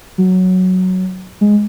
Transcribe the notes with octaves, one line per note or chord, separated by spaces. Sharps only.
F#3
G#3